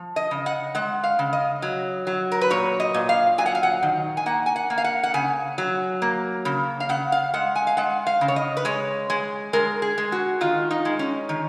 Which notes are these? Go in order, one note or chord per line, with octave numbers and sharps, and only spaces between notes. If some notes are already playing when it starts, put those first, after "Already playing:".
Already playing: F3
D#5
C#3
F#5
G#3 F#5
F5
C#3
D#5
F#3
F#3
A#4
B4
A#2 C#5
D#5
A#2
F5
F#3 G#5
F#5
F5
F#5
D#3
G#5
A#3 F#5
G#5
F#5
A#3
F5
F#5
F#5
C#3 G#5
F#3
A#3
C#3
F5
C#3 F#5
F5
G#3 F#5
G#5
F5
G#3 F#5
F5
C#3
C#5
D#5
B4
G#3 C#5
G#3
G#3 A#4
G#4
G#3
F#4
D#3 F4
D#4
G#3
C#4
D#3